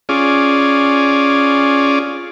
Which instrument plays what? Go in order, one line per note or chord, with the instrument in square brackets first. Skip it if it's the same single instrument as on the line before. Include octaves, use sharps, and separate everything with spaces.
[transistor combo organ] C#4 F4 G#4 D5